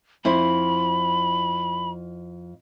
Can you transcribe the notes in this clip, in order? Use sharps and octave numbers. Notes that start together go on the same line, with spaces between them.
F2 E4 C5 B5